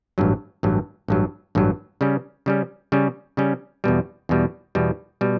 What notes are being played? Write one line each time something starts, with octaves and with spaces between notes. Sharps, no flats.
A1 G2 F#3
A1 G2 F#3
A1 G2 F#3
A1 G2 F#3
C#3 G3 C#4
C#3 G3 C#4
C#3 G3 C#4
C#3 G3 C#4
E2 B2 G3
E2 B2 G3
E2 B2 G3
B2 G3